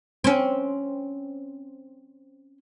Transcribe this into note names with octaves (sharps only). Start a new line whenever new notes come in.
C4 C#4